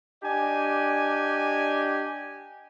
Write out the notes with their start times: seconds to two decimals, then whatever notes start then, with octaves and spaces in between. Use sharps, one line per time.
0.23 D4 G4 D#5 G#5